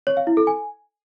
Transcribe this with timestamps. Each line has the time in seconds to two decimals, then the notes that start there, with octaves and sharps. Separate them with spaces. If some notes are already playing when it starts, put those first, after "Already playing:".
0.07 C#5
0.17 F5
0.27 E4
0.37 A4
0.47 G#5